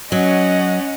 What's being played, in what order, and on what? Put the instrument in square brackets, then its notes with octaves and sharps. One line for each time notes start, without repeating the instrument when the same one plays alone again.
[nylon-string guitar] F#3 [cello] C#4 [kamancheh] D#5 F#5